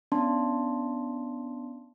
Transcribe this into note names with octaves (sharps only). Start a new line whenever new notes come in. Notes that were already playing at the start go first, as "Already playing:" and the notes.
B3 C#4 D4 A5 C6